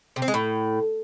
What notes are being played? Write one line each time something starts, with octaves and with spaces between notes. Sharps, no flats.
C3
C4
G#3
A2